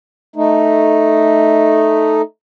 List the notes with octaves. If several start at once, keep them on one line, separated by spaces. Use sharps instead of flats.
A3 D#4